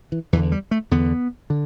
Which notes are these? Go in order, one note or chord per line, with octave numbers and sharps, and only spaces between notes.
E3
E2 D3 E3
G3
A3
E2 D3 B3
D3